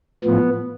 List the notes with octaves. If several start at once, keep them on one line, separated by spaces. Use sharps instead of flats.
A2 F3 B3